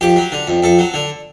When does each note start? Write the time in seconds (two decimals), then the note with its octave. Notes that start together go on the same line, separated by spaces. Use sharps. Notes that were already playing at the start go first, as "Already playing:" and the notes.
0.01 F2 G4
0.16 F#3
0.32 D3
0.47 F2
0.63 F2 A4
0.79 F#3
0.94 D3